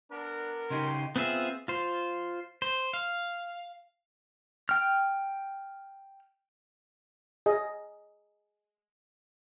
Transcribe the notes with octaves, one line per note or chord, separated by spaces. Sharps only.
B3 D4 A#4
C#3 D#4 G4 C6
B3 C4 F4 G#4 E5
F4 C5
C5
F5
G5 F6
G#4 D#5